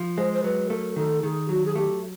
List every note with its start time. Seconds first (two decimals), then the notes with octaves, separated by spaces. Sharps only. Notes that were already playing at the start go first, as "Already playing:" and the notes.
Already playing: F3
0.18 G#3 C5
0.33 C5
0.44 F#3 B4
0.70 A3 A#4
0.96 D#3 A4
1.23 D#3 G#4
1.49 F#3 F#4
1.65 G#4
1.75 A3 G4